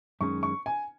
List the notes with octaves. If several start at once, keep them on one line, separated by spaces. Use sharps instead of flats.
F#2 D#3 G#3 C#4 C#6
C#6
G#5